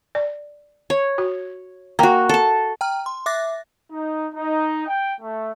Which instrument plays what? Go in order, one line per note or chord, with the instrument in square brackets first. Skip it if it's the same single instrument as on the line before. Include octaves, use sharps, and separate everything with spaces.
[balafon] D5
[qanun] C#5
[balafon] F#4
[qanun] A#3 F#4 [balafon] G5 A#5
[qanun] A4 A5
[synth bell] G5 A#5 F6
C6
E5 D6 F#6 A6 A#6
[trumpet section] D#4
D#4
G5
A3